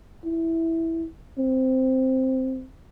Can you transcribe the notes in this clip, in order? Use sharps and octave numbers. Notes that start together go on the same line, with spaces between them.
E4
C4